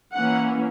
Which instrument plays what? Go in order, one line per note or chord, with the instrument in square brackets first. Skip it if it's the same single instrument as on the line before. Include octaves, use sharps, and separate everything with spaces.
[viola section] E3 A#3 C#4 F#5